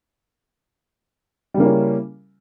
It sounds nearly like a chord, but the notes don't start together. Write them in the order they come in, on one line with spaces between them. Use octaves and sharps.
G3 C#3 A#3 E4 C#4